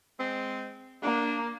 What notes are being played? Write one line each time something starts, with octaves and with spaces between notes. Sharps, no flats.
G#3 C4
A#3 D4